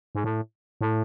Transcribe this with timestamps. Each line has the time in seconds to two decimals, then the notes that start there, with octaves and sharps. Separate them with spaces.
0.15 G#2
0.24 A2
0.81 A2